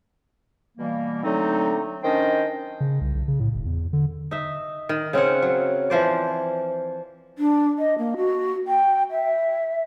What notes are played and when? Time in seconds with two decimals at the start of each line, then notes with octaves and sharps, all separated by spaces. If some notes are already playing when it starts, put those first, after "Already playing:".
0.78 B2 E3 G3 A#3
1.24 D3 F#3 A3 C4 D#4
2.04 D#3 C#4 D4 C5 D#5 G5
2.80 C#3
3.01 C2
3.15 B1
3.28 C#3
3.40 A2
3.55 E1
3.66 E2
3.93 D3
4.31 D#4 E5
4.89 D#3
5.13 C#3 C4 C#4 F#5
5.42 F#3
5.90 E3 F3 C5 D5
7.38 D4
7.79 D#5
7.98 A#3
8.17 F#4
8.67 G5
9.11 E5